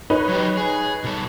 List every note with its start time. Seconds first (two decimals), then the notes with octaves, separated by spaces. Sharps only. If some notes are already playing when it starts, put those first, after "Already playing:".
0.10 D#4 B4 C#5
0.29 F#3 G4
0.57 G#4
1.04 B2 A4